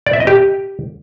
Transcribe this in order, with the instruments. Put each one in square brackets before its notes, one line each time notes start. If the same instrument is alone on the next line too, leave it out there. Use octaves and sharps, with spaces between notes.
[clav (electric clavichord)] D5
E5
D#5
G4